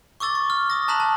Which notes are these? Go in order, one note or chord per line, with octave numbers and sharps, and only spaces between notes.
C#6 D6 E6 A6 G7
C#6
F6
D#6 A#6
A5 A#5 F#6 B6 E7 F#7
A5